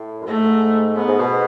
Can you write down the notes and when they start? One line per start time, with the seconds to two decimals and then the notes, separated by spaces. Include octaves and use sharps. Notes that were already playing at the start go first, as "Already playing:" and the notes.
Already playing: A2
0.21 F#2
0.27 G#2 A3
0.97 G#2 B3
1.08 G#2
1.20 B2